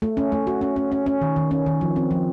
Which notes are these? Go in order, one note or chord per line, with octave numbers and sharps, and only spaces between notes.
A3
C#4
A3
F#4
C#4
C#4
C#4
C#4
D#3
D#3
C#4
D#3
F3
C4
F3